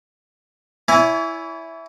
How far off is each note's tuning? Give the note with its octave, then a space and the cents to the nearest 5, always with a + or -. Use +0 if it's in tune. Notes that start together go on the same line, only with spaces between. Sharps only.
E4 +0 C#5 +45 G#5 +0